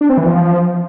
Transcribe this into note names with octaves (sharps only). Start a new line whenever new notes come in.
D4
C4
E3
F3